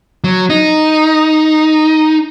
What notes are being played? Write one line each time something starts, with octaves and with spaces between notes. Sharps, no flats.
F#3
D#4